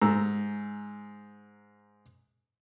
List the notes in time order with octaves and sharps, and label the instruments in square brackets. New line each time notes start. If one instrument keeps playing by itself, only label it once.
[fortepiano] G#2 A#5 E6